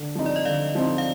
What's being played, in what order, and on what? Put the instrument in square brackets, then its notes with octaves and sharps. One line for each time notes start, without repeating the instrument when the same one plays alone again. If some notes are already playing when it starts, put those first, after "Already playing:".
Already playing: [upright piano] D3
F3 C4 D#4
[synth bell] D5
D#5
[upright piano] D3 [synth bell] D5 F5
[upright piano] F3 C4 D#4
[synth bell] F5